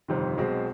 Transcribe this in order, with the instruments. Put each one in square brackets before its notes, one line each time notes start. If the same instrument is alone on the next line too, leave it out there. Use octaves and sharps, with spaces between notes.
[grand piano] G1 F2 C3 D#3
B1 B2 G#3 C4